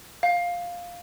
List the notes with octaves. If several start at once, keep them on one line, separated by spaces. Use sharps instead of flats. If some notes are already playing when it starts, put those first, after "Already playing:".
F5